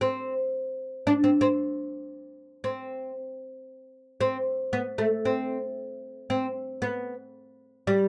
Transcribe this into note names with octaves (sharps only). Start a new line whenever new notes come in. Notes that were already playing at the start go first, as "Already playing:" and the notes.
C4
D4
C4
C4
C4
C4
B3
A3
C4
C4
B3
G3